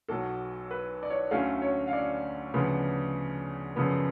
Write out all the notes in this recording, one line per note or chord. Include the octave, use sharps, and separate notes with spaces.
B1 B2 F#3 A4
B4
D5
C#5
D2 D3 F#3 A3 C#4 F5
C#5
F5
D5
D2 C#3 F3 B3
F#2 C#3 F3 B3